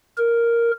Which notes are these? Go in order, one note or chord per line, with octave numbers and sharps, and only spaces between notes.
A#4